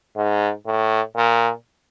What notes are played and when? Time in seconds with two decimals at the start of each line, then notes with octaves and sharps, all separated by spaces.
0.17 G#2
0.66 A2
1.16 A#2